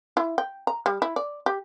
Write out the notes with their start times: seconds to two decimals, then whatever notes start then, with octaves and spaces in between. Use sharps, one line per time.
0.17 E4
0.38 G5
0.67 A#5
0.86 G3
1.02 E4
1.16 D5
1.46 G4